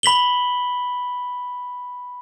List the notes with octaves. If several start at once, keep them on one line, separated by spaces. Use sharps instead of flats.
B5 B6 F#7 G7